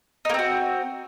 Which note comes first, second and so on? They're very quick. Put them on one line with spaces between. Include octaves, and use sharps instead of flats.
D#4 A#3 C4 F#4